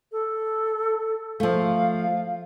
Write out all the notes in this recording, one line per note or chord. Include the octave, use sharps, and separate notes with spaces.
A4
F3 A3 F5